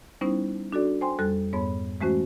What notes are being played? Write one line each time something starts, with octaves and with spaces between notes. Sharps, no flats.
G3 B3 C#4 D#4 E4 C5
D4 F#4 A4 D5
C5 G5 G#5 C6
F2 G3 A4 F#6
F2 G#2 B3 C#5 B5
E3 G#3 A3 C#4 F#4 C5